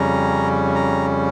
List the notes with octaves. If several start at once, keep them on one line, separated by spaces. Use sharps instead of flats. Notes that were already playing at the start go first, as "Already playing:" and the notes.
Already playing: F2 C#3 G3 C#4 A#5
A#5